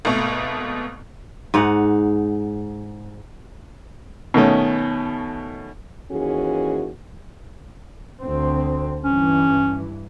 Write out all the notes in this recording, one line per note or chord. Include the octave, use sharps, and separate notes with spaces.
G#1 B2 A3
G#2 D#4 F#5
B2 D#3 A3 C#4
D#2 E3 C#4 F#4 G#4
D2 C4
G2 E3 C#4